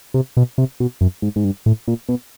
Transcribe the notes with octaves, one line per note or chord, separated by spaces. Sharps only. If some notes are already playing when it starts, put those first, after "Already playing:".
C3
B2
C3
B2
F#2
G#2
G#2
G2
A2
A#2
B2